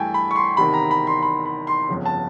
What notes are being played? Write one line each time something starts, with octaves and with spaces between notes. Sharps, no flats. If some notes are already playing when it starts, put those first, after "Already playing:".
Already playing: G2 E3 A3 G5 G#5
B5
C#6
C6
E2 C3 D#3 B5
A#5
B5
C6
B5
B5
C6
G1 F2 C#3
A5